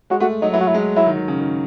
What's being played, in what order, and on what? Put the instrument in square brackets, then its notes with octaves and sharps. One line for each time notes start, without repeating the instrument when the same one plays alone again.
[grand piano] G#3 [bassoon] F#4
[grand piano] A3 [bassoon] F#4
[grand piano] F#3 [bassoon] D#4
[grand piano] F#3 [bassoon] E4
[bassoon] F#4
E4
[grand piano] G#3
[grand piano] F#3 [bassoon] E4
[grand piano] D#3
D#3
C#3
D#3